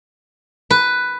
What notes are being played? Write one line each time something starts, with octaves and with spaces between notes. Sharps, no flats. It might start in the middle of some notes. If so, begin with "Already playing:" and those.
B4